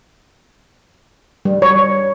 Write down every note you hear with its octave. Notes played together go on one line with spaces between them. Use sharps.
G3
C#5